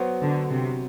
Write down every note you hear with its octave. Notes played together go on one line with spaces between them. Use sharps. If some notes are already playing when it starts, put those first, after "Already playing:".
Already playing: F#3 B3 F#4 C5
D3
C3